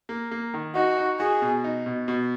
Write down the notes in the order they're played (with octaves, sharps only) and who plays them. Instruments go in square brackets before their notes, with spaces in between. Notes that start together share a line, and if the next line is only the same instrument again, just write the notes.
[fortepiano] A#3
A#3
D#3
[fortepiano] D#4 [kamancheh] F#4
[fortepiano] D#4
[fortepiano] F#4 [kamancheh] G#4
[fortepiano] B2
D#4
B2
B2